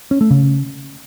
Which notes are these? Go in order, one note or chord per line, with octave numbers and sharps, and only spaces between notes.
C#4
A3
C#3